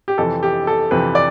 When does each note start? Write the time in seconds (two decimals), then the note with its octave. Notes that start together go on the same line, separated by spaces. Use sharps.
0.08 G4
0.18 F2 C3 E3 A4
0.43 G4
0.67 A4
0.91 F2 C3 E3 B4
1.15 D5